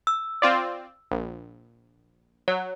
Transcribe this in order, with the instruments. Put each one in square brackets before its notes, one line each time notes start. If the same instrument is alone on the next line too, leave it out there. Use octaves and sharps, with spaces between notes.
[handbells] E6
[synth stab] C4 F4 D5
A#1
[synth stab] F#3 [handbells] C#5